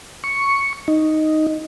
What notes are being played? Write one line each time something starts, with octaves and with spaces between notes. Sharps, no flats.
C#6
D#4